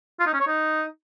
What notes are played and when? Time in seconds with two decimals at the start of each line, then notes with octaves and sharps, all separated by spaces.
0.20 F4
0.27 D#4
0.33 C#4
0.40 C#5
0.47 D#4